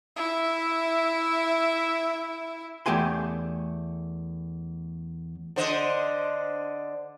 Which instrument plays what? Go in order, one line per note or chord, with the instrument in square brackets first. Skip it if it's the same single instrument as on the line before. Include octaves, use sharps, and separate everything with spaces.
[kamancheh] E4 E5
[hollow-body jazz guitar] E2 A3 G4 E5 G#5 C6
[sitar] D3 C5 D#5